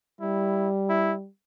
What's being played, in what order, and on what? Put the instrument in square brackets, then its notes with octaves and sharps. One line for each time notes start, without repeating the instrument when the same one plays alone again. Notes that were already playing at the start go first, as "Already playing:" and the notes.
[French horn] G3 [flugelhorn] E4
[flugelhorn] E4